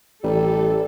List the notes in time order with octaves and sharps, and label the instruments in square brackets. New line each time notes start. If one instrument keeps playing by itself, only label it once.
[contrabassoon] A1 [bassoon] G3 [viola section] A4